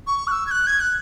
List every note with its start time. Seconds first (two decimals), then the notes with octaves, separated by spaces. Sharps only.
0.07 C#6
0.27 F#6
0.31 E6
0.47 G#6
0.51 F#6
0.67 G#6
0.80 F#6